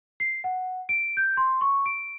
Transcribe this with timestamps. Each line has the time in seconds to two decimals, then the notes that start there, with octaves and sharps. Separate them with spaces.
0.20 C7
0.44 F#5
0.89 D7
1.17 G6
1.37 C6
1.61 C#6
1.86 D7